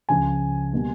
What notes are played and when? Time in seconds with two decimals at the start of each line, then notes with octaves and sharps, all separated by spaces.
0.09 C#2 C#3 F3 G#5
0.73 B2 G3 A#3